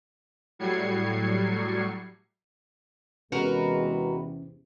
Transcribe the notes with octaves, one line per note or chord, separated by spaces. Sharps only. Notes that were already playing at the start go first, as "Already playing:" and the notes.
A2 F#3 G3 G#6 C7 C#7
E2 C3 G#3 B3 C#4 F#4 A#4 B4